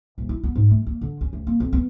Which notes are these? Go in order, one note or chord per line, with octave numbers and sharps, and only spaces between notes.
D#1
E4
B3
G#2
A3
A#3
D3
C#4
D2
A#3
F2
B3